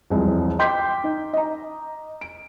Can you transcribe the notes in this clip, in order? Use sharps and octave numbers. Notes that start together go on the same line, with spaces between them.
E1 C2 E3 F3 G#3
D#5 G5 C6 D6 G6 B6
D#4
D#5 A#5
D7